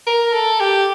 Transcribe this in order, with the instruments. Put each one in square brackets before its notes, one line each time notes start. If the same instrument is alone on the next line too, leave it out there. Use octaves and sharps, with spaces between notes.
[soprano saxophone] A#4
A4
G4